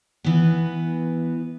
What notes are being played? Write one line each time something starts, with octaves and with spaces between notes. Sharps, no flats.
E3 B3